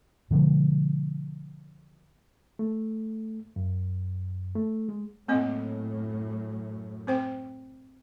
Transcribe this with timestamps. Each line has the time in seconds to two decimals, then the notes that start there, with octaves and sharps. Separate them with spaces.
0.31 B2 D3 F3 G#3
2.59 A3
3.56 F#2
4.55 A3
4.89 G#3
5.28 F#2 A2 A#3 C4 D#5
7.07 C4 C5 G5